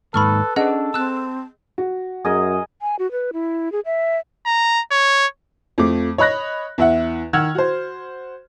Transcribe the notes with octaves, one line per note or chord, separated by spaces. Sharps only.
D#2 G#2 D#4 A4 B4 B5 C#6 F6
C#4 D4 G#4 A4 D5 D#5 F#5
C4 A5 E6 F#6
F#4
F#2 G#4 A#4 D#5
G#5
F#4
B4
E4
G#4
E5
A#5
C#5
F2 F3 A3 D6
C#5 D#5 B5 F#6 A#6
E2 E4 E5 F#5
D#3 F#5 E6 F6 G#6
F#4 C5